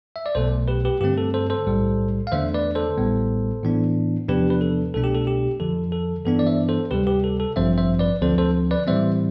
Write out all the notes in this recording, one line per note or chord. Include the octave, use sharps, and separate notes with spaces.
E5
D5
B1 B2 A3 A4 C5
G4 B4
G4 B4
G2 D3 A3 C4 G4
A4
A4 C5
A4 C5
B1 A2 G3
F5
E2 D3 A3 D4 C5 E5
B4 D5
A4 C5
A1 A2 G3 B3
A2 E3 B3 D4
E2 C3 F3 B3 D4 G4 B4
B4
A4
C2 B2 A3 D4 A4
G4
A4
G4
F2 D3 F3 A4
A4
G2 E3 B3 D4 A4
D5
C5 E5
A4 C5
D2 C3 G3 G4 B4
G4 B4
A4
A4
A1 G2 F3 C4 C5 E5
C5 E5
B4 D5
D2 D3 F3 C4 A4 C5
A4 C5
B4 D5
A2 E3 G3 C4 C5 E5